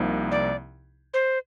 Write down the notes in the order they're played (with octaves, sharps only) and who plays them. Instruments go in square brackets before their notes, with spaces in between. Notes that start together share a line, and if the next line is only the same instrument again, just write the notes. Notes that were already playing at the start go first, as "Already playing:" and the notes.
Already playing: [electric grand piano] C2 C3 F3 A#3 D#4
[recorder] D5
C5